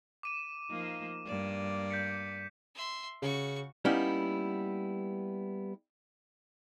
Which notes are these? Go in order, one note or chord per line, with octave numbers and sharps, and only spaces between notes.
D6 D#7 E7
F3 A#3 D#4
G2 A#3 D5
G6 B6 C#7
E5 C6
C#3 F#4 C#6
G3 A#3 B3 C#4 D#4 E4